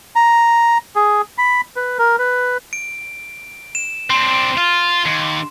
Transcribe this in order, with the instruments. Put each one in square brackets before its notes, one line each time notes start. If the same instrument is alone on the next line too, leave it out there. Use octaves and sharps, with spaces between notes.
[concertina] A#5
G#4
B5
B4
A#4
B4
[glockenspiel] D7
E7
[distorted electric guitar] C4 D4 [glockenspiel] C6
[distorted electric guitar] F4
D#2